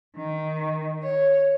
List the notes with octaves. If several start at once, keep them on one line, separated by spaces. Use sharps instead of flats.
D#3
C#5